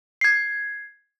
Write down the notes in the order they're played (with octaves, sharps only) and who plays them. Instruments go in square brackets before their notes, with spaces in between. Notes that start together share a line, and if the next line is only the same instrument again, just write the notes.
[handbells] G#6 C7